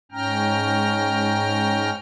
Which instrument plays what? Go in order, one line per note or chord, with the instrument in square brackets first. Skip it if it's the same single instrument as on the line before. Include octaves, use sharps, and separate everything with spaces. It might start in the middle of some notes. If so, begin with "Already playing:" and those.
[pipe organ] G#2 C#4 G5 A#5 F6